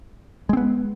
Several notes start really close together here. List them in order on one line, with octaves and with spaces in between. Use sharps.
G#3 C4 B3